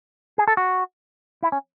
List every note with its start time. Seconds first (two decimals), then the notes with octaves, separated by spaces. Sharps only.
0.38 G#4
0.48 A4
0.57 F#4
1.43 E4
1.52 C#4